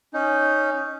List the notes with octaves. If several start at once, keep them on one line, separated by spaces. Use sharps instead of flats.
C#4 D#4